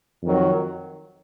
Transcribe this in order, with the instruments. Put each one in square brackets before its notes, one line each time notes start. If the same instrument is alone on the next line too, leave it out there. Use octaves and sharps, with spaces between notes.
[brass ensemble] F2 D#3 F#3